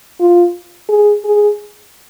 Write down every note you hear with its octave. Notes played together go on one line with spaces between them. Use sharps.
F4
G#4
G#4